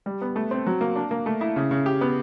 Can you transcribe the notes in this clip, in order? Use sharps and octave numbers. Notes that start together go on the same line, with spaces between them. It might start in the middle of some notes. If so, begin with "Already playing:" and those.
G3
B3
A3
C4
F#3
A#3
D4
A#3
A3
E4
C#3
C#3
G4
B3